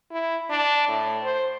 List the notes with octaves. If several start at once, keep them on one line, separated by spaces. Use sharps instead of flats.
E4
D4
A2
C5